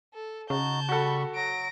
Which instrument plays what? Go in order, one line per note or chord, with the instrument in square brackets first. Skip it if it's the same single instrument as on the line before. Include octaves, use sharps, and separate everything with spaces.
[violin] A4
[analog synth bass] C#3 [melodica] D#4 F#4 [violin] A5 G6
[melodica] G3 B5 C#6 [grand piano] F#4 A4
[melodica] F#3 [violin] A#6 D7